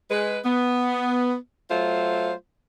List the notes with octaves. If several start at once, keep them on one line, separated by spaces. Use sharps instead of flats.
G#3 B4
B3
F#3 A3 F4 C5